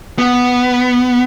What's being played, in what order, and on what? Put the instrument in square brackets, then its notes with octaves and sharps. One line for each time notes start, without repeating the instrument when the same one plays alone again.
[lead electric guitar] B3